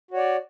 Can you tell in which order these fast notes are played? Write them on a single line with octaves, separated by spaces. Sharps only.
F#4 C#5 D5